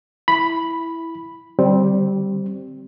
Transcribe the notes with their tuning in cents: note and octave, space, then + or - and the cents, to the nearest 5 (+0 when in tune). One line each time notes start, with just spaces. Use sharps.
E4 +0 B5 +0
D3 +0 G3 -15 C4 +0